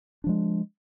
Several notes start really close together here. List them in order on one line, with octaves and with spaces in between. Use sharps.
D4 F3 G#3